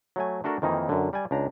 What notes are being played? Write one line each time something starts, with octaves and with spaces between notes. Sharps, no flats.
F#3 A3 G#5
A3 D4 F#4 A4 A#4
F2 D#3 E3 A#3 D#4
F#2 D3
G3 D5 G#5
C#2 D4 A#5